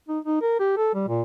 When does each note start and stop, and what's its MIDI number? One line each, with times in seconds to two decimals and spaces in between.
0.09 0.19 63
0.25 0.38 63
0.41 0.56 70
0.60 0.75 67
0.77 0.91 69
0.94 1.04 55
1.08 1.22 46